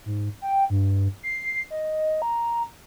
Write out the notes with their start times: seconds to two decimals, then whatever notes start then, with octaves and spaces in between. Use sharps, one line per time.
0.06 G#2
0.42 G5
0.70 G2
1.23 C7
1.70 D#5
2.22 A#5